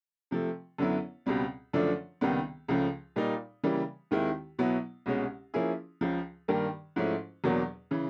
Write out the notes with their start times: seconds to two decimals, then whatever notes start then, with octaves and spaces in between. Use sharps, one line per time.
0.31 C3 F3 A3
0.78 F#2 D3 F#3 B3 E4
1.26 C#2 B2 G3 C4
1.73 F#2 D3 F3 A3 D4
2.21 C#2 C3 D#3 G3 B3
2.68 C#2 C#3 F3 A3
3.16 A#2 G3 A#3 D#4
3.64 C#3 E3 G3 A#3
4.11 D#2 D#3 G#3 C4 E4
4.59 B2 F#3 B3 E4
5.06 C2 B2 G#3 C#4
5.54 F3 A#3 C#4 E4 G#4
6.01 C#2 C#3 F3
6.48 G2 D#3 G3 A#3
6.96 G#2 F3 A3 C#4 E4
7.44 E2 B2 F#3 A#3 D4
7.91 C#3 E3